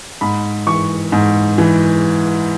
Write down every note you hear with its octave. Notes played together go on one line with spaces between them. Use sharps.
G#2 B5
E3 C#6
G#2
E3